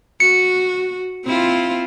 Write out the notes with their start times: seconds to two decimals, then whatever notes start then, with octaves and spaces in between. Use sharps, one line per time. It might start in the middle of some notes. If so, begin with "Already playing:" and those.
0.20 F#4 C#7
1.25 C4 E4 F4